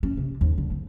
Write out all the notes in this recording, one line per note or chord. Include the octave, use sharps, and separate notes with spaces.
C#4
C3
D#2
D3
C4